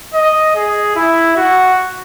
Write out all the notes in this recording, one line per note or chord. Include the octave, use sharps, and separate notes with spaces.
D#5
G#4
E4
F#4